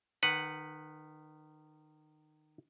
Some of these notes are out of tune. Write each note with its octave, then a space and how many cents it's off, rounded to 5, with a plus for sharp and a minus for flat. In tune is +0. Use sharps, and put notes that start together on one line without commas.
D#3 -25 B4 +0 F#5 +0